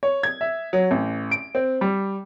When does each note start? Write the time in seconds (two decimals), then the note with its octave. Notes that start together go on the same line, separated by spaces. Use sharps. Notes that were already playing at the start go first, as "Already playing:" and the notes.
0.03 C#5
0.23 G#6
0.41 E5
0.73 F#3
0.91 A1
1.31 D7
1.55 C4
1.81 G3